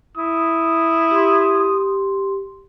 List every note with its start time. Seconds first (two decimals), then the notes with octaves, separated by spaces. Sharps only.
0.17 E4 D#6
1.11 G4 C6